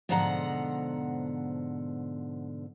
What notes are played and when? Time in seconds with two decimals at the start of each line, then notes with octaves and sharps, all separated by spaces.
0.09 G#2 B2 D3 F3 F#5 A#5